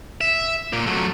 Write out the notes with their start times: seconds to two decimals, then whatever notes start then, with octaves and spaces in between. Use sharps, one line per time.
0.21 E5
0.73 A#2 A#3
0.86 F#3 A3